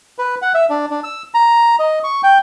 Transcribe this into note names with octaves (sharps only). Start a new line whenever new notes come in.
B4
F#5
E5
D4
D4
E6
A#5
D#5
C#6
G5